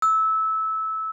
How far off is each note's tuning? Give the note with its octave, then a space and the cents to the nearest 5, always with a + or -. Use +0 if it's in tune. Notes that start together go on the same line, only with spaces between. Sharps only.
E6 -20